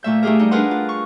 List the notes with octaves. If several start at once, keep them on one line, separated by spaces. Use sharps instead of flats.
A#2 A3 E5 G6
A3 D#4 G4 G#4 A#4
G3 D#4
D4 G#4 A#4 B4 F#5 C6
F4
C#6